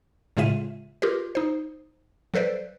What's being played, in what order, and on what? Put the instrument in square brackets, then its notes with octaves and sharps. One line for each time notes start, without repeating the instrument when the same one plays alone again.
[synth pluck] A2 C#3 G#3 F4 E5 D#7
F4 G4 A#4 B4
D#4 C5
F#3 A4 B4 C5 D5